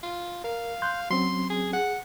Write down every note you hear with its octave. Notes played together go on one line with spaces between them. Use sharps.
F4
A#4 F5
C6 F#6 G6
F#3 C4 C#4 C6
G#4
G#4 F#5